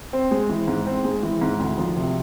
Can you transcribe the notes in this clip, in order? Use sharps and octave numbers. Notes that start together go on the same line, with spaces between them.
C4
G#3
E3
G#2
C4
G#3
E3
G#2
D2
F3
C3